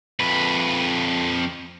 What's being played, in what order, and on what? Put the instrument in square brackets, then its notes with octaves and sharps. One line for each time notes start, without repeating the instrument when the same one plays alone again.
[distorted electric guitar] F2 B4